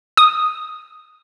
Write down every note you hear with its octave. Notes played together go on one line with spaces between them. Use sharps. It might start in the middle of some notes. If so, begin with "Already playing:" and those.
D#6